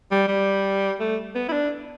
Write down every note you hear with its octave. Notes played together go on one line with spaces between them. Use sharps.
G3
G3
A3
B3
E4
D4